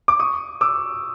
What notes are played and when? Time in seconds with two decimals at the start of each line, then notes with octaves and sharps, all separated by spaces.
0.08 D6
0.20 C#6 D#6
0.61 D6 E6